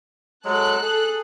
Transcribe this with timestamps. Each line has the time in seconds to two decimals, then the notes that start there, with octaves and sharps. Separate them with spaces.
0.45 F#3 G#3 A4 F#6
0.81 G#4